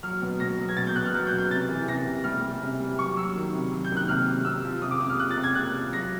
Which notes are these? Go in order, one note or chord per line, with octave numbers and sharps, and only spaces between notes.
F#3 F6
B2
B2 A#6
F#3
G#6
B2 A6
G6
B2 F#6
F6
F#3 F#6
G6
B2
G6
C3 A6
E3
C3 A#6
C3
G3 F6
G3
C3
G3
F#3 C#6
F#3 E6
D#3
C3
F#3
G6
D#3
F#6
C3 F6
C3
C3 E6
F3
C3 D#6
D6
C3 D#6
F6
F3 F#6
A6
C3
G#6
C3 F#6
F3
F#3 A#6